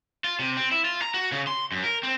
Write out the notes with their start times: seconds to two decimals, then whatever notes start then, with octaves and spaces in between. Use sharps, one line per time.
0.24 F4
0.39 C3
0.57 C4
0.71 E4
0.85 F4
1.02 A#5
1.14 F#4
1.32 C#3
1.47 C6
1.72 F#2
1.84 A#4
2.03 C4